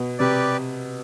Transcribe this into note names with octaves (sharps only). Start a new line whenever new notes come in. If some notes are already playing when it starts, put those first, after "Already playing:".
Already playing: B2
C3 G4 B4 D5